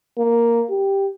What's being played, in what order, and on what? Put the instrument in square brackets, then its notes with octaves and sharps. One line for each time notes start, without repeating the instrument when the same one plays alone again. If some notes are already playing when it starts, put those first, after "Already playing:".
[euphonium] A#3
G4